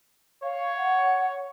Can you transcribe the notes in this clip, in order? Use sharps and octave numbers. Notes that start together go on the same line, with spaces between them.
C#5 F5
F#5